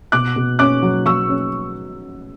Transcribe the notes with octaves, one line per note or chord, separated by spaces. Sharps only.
B2 D6 F#6
B2
C#4 D6 F#6
F#3
F#3 C#6 E6
C#4